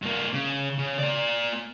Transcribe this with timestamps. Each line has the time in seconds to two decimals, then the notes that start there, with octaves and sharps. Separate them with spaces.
0.02 G2 A#3
0.33 C#3
0.79 C#3
0.99 A#3 D5